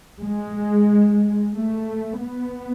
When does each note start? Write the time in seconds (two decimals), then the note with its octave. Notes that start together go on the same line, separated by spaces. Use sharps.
0.21 G#3
1.53 A3
2.20 B3